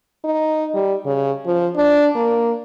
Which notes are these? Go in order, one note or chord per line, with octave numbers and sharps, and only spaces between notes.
D#4
G3
C#3
F3
D4
A#3